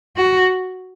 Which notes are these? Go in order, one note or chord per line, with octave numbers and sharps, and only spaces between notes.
F#4